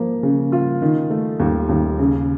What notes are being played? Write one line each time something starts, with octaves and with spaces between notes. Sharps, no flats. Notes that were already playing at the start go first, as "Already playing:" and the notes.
Already playing: F3 A#3
C#3
F4
D#3
A3
D#2
D#2
C#3